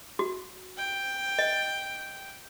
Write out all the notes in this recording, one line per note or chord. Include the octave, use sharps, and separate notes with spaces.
F#4
G5
D#5